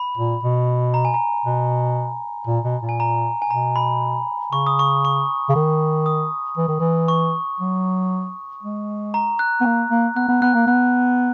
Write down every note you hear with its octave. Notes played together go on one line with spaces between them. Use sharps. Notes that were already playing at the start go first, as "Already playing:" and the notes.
Already playing: B5
A#2
B2
A#5
G#5
A#5
B2
A#2
B2
A#2
G#5
A#5
G#5
B2 A#5
B5
C#3 C#6
D#6
C#6
C#6
C#3
D#3
D#6
E3
D#3
E3
C#6
F#3
G#3
A#5
F#6
B3
A#3
A#3
B3 F#6
B3
B3 F#6
A#3
B3 F#6